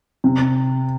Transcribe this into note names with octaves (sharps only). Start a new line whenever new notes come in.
C3